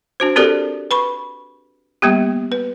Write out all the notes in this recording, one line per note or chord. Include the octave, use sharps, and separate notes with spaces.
D4 F#4 C5
C4 F#4 G4 A4 A#4 D5
B4 B5 C#6
G3 A#3 B3 G4
B4